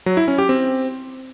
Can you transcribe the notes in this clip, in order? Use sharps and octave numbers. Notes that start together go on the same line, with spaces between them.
F#3
E4
C#4
G4
C4